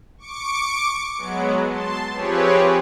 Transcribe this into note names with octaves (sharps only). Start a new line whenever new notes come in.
C#6 D6 C#7 D7
F#3 G#3 B3
A5 C6
F3 C4 G4 G#4 B4 C#5